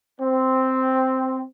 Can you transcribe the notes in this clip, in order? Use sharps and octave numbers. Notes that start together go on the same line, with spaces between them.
C4